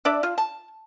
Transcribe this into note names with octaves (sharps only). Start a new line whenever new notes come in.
D4 D5 E5
F4
A5